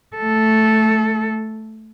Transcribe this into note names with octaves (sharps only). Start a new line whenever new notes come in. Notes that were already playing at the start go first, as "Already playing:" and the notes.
A3 A4